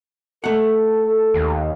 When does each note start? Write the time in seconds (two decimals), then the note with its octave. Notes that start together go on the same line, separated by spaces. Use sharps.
0.44 A3 A4 F#5
1.34 D#2